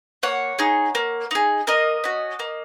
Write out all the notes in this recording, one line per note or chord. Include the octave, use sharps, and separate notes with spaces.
A#3 C#5 F#5
D#4 G#4
A#3
D#4 G#4
A#3 A#4 D#5
C#4 F#4
A#3